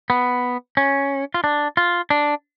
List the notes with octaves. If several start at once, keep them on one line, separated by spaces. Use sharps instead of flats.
B3
C#4
F4
D4
F4
D4